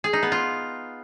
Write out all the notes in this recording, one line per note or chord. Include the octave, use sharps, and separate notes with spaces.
G#4
D#4
B3
F4